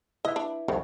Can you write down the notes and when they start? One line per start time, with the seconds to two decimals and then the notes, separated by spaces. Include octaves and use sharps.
0.25 E4 B4 D#5 E5
0.36 D4
0.68 C2 F2 A2 C#3